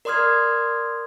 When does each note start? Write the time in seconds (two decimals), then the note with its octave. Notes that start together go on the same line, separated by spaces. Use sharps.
0.05 A#4 D5 C6 D#6 F6 G#6